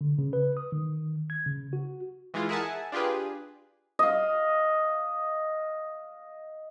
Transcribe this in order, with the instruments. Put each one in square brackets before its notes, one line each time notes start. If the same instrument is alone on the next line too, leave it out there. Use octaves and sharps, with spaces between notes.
[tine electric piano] D3
C#3
B4
D#6
D#3
G#6
C#3
F#4
[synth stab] E3 G#3 E4 F4
G#4 A#4 E5 F#5 G#5 A5
D4 F4 G4 G#4 B4
[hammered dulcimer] D#5 F5